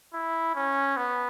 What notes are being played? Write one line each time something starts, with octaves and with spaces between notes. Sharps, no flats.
E4
C#4
B3